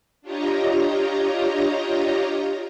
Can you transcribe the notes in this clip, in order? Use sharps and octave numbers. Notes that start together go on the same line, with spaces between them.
D4 F4 G4 C#5 D#5 A#5